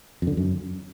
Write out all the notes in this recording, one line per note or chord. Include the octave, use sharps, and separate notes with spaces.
F2
D3
F2
F#2